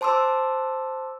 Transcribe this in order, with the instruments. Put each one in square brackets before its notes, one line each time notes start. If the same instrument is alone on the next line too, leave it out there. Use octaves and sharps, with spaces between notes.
[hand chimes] C5 A5 C6 D6 E6